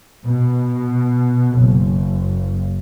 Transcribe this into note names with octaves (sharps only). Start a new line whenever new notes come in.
B2
F#1